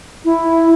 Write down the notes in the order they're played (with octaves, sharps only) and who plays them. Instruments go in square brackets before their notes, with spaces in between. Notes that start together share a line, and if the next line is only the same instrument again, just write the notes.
[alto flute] E4